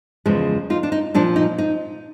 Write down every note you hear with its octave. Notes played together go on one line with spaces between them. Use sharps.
E2 C#3 F3 G#3
D#4 F4
D4
D#4
A#2 F3 A#3 D4
D#4
D#4